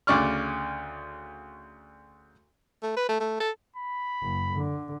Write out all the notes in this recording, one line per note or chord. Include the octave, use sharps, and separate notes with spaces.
D2 C#3 D5 C#6 F6
A3
B4
A3
A3
A4
B5
F#1
D3